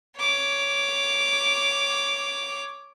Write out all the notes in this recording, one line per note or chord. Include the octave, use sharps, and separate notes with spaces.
C#5 D6